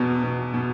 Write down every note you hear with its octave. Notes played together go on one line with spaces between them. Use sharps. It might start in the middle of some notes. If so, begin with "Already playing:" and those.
Already playing: E2 B2
B2
B2